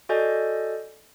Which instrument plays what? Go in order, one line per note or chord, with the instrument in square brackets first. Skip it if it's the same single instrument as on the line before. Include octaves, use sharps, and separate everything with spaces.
[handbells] F#4 A4 D5 D#5 G#5 G6